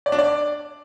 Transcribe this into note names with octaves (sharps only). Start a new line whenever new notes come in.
D5
D4
D5